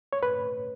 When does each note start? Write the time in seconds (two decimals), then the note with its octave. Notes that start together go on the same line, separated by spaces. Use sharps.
0.13 C#5
0.23 B4